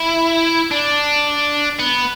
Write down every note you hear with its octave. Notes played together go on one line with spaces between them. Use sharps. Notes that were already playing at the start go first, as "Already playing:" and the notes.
Already playing: E4
D4
B3